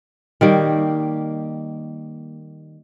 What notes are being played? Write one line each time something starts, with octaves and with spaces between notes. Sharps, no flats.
D#3 G3 A#3